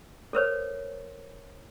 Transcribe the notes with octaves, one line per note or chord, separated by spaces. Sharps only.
A4 A#4 C5 C#5